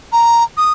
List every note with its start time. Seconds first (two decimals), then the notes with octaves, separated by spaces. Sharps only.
0.12 A#5
0.57 D#6